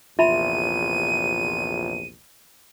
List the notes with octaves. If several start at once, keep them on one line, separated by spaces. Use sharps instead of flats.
A#1 E2 C3 F4 E5 B5 D#7